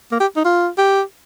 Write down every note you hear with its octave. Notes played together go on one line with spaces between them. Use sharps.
A#3
G4
D#4
F4
G4